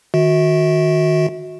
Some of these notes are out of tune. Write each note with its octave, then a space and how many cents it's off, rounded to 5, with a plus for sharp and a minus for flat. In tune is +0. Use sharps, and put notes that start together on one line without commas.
D#3 +0 F#4 -20 E5 -40